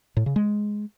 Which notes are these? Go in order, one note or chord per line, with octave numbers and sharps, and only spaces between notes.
A2
C#3
G#3